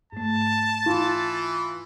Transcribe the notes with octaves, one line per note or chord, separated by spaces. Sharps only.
G#2 A3 A5
E3 F4